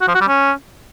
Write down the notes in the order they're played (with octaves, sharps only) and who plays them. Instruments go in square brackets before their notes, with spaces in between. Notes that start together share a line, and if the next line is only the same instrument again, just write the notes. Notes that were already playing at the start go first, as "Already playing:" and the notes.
[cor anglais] F#4
F3
F#4
G3
C#4